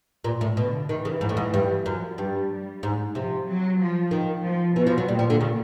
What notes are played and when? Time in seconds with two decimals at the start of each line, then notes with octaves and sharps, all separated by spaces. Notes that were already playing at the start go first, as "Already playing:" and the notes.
0.24 A#2
0.41 A2
0.57 B2 D3
0.89 D#3 E3
1.05 C#3
1.21 G#2
1.29 A2
1.37 G#2
1.54 G2
1.86 F#2 F3
2.18 G2 G3
2.50 G3
2.83 G#2
3.15 C3 F3
3.47 F#3
3.79 F3
4.11 D#3
4.44 F3
4.76 B2 E3
4.87 F3
4.98 F#3
5.08 A#2 G3
5.19 F3
5.30 D3
5.41 C#3